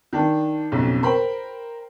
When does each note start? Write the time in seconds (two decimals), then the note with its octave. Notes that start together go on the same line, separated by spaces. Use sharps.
0.13 D#3 D4
0.72 B1 F2 C#3
1.03 A#4 C5 G5 B5